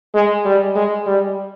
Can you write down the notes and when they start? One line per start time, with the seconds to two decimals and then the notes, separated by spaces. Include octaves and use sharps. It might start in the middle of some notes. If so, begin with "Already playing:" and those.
0.14 G#3
0.45 G3
0.75 G#3
1.06 G3